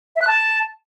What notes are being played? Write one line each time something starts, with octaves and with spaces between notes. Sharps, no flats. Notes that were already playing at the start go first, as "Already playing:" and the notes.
E5
F#6
A5